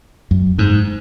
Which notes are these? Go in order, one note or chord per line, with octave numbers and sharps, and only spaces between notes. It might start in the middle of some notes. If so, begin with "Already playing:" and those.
F#2
G#2